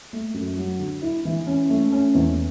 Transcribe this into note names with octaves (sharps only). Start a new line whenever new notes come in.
A3
F#2
F#3
D3
E4
E3
C#4
A3
C#4
E2